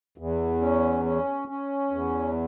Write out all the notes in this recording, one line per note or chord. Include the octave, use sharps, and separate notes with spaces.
E2
C#4
C#4
C#4
E2